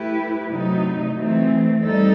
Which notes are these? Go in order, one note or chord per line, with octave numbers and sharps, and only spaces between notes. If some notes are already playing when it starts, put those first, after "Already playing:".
Already playing: A3 E4 G4 B4
C3 F#3 A3 D#4
E3 A3 C4
G3 D#4 A4